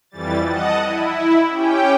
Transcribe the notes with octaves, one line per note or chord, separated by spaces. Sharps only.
F2 E3 G3 A6
D#5 F#5 A5 D#6
E4
C#4 G4 G5